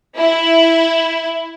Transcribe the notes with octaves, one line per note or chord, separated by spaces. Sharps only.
E4